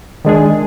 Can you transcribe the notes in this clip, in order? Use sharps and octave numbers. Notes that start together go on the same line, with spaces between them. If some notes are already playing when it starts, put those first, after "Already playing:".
D#3 G#3 D4 G#4